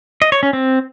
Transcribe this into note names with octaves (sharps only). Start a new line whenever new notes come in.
D#5
C#5
C#4
C4